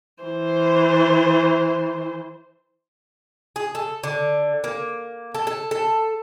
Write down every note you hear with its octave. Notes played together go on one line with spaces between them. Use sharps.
E3 C5
G#4
A4
D3
A#3
A4
A4
A4